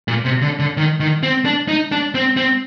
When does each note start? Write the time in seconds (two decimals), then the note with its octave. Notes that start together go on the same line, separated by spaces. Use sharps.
0.08 A#2
0.25 C3
0.42 D3
0.59 D3
0.77 D#3
1.00 D#3
1.23 C4
1.45 D4
1.68 D#4
1.92 D4
2.15 C4
2.37 C4